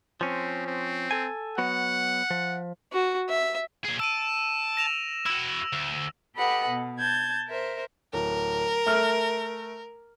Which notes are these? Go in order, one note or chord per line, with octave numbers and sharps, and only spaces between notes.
F3 C4 C#4
C4
A4 G#5
F#3 B3 F#4 F#5
F3
F#4
E5
A#2 G#4
A5 E6 D7 D#7
A#6 E7 F7
E4 F#4 E6
D2
G4 A4 B4 D#5 F#5 B5
B2
A5 G6 G#6
A#4 C5 E5
D1 A#4
A3 F6